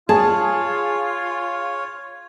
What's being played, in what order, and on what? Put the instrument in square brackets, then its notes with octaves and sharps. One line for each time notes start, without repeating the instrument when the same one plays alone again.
[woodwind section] F4 [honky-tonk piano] G#4 [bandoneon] C#5 [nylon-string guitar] A5